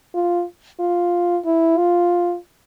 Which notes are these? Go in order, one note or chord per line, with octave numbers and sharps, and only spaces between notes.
F4
F4
E4
F4